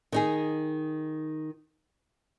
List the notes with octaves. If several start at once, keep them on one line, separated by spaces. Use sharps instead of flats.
D#3 D#4 G#4